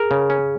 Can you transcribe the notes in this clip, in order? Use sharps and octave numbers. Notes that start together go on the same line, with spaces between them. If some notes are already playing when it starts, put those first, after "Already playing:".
Already playing: G#4 A#4
C#3
C#4